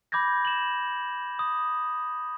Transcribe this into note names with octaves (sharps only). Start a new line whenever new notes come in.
B5 D6 G6 G#6 A#6
E7 F#7
D#6